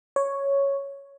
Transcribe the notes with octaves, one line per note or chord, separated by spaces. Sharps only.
C#5